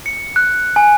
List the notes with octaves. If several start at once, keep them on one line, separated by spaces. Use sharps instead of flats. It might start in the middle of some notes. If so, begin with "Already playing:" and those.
C#7
F#6
G#5